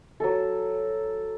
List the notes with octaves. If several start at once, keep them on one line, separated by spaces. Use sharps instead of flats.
F#3 A4